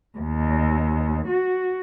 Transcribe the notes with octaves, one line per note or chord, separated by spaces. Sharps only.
D#2
F#4